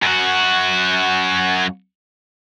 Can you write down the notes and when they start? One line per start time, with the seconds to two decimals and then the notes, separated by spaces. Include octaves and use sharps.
0.03 F#2 F#4